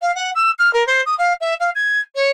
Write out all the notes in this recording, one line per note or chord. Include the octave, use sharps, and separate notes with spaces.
F5
F#5
E6
F6
A#4
C5
D#6
F5
E5
F5
G#6
C#5